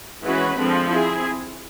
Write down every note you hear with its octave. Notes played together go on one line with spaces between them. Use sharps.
E3 G#3 C#4 F#4 B4
D3 F3 G#3 C4
C4 E4 G#4